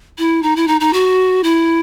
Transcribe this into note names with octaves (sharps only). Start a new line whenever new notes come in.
E4
D#4
E4
D#4
D#4
F#4
E4